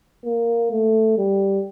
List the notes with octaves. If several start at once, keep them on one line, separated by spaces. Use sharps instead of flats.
A#3
A3
G3